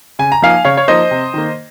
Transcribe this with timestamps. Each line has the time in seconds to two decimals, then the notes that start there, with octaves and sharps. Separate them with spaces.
0.19 C#3 G#5
0.32 A#5
0.42 F3 A#3 D#4 F5 G#5
0.65 C#3 C#5 F5
0.77 C#5
0.88 F3 A#3 D#4 C5 D#5
1.11 C3
1.34 D#3 A#3